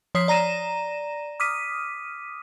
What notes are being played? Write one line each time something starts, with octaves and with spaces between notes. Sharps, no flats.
F3 C#5 D#6 B6 C7
D5 A#5 A#6 D#7 E7
D6 D#6 F6 B6 D#7